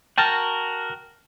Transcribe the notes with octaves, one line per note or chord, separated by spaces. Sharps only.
F#4 A#4 G5 A5 F6